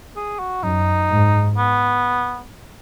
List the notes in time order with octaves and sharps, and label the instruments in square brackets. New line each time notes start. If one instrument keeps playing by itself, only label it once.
[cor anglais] G#4
F#4
[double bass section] F#2 [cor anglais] D#4
[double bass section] G#2
[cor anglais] B3